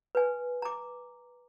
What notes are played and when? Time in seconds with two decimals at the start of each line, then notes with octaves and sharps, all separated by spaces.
0.15 B4 G#5
0.62 A#5 D6